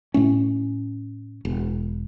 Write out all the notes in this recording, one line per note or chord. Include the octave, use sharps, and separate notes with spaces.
A2 A3 C#4
E1